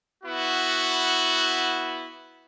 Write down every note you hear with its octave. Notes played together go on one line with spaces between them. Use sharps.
B3 E4 F#4